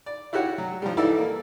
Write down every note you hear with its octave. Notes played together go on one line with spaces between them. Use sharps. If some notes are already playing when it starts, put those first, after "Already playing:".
D5
E4 F#4 G4 C#5 F#5
F#3
F3 G3
E3 D#4 E4 A4 D5 E5
A#3